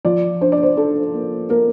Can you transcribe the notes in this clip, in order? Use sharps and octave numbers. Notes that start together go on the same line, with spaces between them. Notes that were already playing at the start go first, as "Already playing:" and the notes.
F3 D5
D4 C5
D5
C5
D4 A4
A#3
A#3 A#4